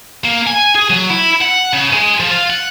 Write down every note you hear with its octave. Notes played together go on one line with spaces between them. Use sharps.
A#3
G#5
G#4
F#3
E4
F#5
C#3
G#3
F3
F4
F#5